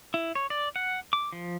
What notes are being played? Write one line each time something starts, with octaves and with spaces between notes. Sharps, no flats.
E4
C#5
D5
F#5
D6
F3